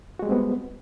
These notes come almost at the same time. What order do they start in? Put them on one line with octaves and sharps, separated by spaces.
F#4 G#3 G3 C4 B3